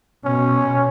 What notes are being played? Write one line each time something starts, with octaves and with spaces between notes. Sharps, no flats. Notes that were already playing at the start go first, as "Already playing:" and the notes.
B2 C#4